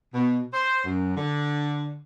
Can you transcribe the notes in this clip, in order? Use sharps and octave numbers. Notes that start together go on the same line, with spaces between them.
B2
C5
F#2
D3